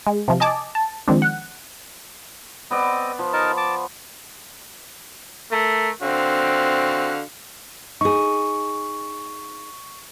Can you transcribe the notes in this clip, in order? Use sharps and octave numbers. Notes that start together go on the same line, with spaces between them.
G#3
C3 F3
D#5 G#5 A5 D6
A5
D#3 F3 G#3 C4 D4
F#5
B3 C4 D5 D#5
F3
D#4 A#4 A5
A5 D6
A3 A#4
D3 C4 F#4 F5
D#4 G#4 C#6